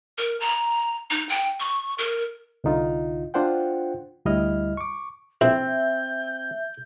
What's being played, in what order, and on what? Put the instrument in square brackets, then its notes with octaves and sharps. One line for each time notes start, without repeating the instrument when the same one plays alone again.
[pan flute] A#4
A#5
D#4
G5
C#6
A#4
[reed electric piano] C2 D3 D#4 F4
D4 F4 C5 F#5 G5
D2 G3 E4 D#5 F6
C#6 D6
[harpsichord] A#1 E4 [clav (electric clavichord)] C4 [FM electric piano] E5 [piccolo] G6